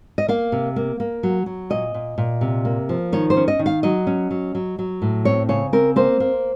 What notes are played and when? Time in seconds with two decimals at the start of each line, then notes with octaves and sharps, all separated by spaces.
0.18 D#5
0.28 A#3 F5
0.52 C3
0.76 A#3
1.00 A#3
1.23 F#3
1.46 F#3
1.70 A#2 D#5
1.94 A#2
2.18 A#2
2.41 C3
2.65 A#3
2.89 F3
3.12 D#3 C#5
3.30 C5
3.37 C#4
3.48 D#5
3.59 D#3
3.66 F5
3.83 F#3 D#5
4.07 C#4
4.31 F#3
4.55 F#3
4.79 F#3
5.02 A2
5.25 C4 C#5
5.49 C#3 C#5
5.73 C4 A#4
5.96 A#3 C5
6.20 A#3